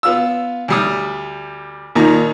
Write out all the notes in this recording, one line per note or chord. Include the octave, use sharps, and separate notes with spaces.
B3 F4 E6
D2 G3 D#6
D#2 A#2 D#3 A#5